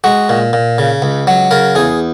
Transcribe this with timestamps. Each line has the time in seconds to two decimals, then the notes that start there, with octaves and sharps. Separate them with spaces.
0.04 G#3 F#4
0.29 A#2
0.53 A#2
0.78 C#3
1.02 C#2
1.27 F#3
1.51 C#3 A#4
1.75 E2 G#4